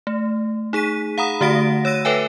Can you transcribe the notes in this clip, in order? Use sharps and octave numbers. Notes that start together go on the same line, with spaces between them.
A3
D#4 G#4 B6 D#7
F5 F#5 A#5 B5 D#6
D3 A3 F#4 F#5 A#6 D7
C#5 E6 A#6 D#7
A4 B4 C#5 E5 G5 G#5